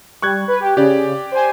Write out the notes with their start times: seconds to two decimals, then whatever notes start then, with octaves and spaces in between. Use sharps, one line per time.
0.22 G3 C#6 F#6 G#6
0.48 B4
0.60 G4
0.77 C#3 G4 D5
1.32 C5 G#5